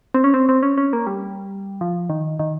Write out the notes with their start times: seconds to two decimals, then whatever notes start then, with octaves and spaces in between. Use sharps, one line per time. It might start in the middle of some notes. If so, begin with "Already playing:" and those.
0.14 C4
0.24 C#4
0.34 C4
0.49 C4
0.63 C#4
0.77 C#4
0.93 A#3
1.07 G3
1.81 F3
2.10 D#3
2.40 D#3